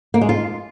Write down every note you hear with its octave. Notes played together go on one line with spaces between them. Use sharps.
A#3
G#3
F4